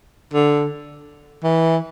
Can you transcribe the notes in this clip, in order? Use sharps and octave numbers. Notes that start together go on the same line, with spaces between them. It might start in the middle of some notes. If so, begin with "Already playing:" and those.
D3
E3